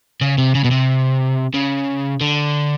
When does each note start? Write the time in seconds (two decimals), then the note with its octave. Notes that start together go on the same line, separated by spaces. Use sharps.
0.21 C#3
0.38 C3
0.55 C#3
0.64 B2
0.71 C3
1.54 C#3
2.21 D3